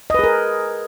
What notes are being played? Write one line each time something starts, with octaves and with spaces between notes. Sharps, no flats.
G#4 A#4 B4 D#5